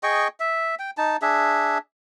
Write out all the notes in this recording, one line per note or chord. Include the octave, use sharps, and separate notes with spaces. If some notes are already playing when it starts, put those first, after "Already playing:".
G#4 D#5 G5 C#6
E5
G5
D#4 A5
D4 G#4 E5